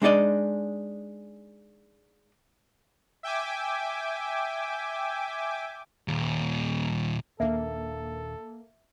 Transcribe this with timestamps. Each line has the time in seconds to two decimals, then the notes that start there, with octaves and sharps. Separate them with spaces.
0.02 G#3 D4 D#4 F#4 D5 D#5
3.23 E5 G5 G#5 D6
6.08 D#2 A#2
7.40 D#1 D#2 A#3 D4 A4 E5